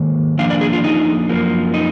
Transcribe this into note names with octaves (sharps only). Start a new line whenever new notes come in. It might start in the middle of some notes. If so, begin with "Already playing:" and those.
Already playing: G#2 D#3 A#3
F2 F3 A#3 D4 F5
D5
G#4
F4
D#4
F#2 F3 A#3
D#4